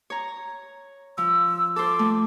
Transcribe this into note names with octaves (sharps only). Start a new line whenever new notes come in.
C#5 A#5
F3 E6
A4 C5 D6
A3